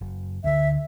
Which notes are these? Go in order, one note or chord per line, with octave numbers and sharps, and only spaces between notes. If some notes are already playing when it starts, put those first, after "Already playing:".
F#1
D2 D3 E5